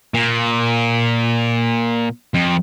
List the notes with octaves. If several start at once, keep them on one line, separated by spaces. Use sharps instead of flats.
A#2
F2